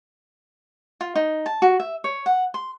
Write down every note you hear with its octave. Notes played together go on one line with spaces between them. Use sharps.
F4
D#4
A5
F#4
E5
C#5
F#5
C6